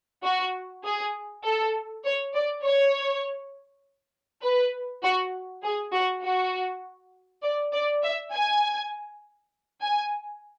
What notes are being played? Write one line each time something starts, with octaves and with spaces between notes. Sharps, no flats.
F#4
G#4
A4
C#5
D5
C#5
B4
F#4
G#4
F#4
F#4
D5
D5
E5
G#5
G#5